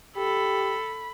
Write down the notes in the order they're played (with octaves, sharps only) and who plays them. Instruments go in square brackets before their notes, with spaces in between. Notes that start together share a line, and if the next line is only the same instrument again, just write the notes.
[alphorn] G4 [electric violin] A4 [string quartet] B5